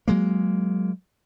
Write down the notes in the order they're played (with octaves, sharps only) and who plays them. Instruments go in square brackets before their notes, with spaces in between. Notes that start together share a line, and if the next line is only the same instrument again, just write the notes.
[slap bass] F#3 G#3 A#3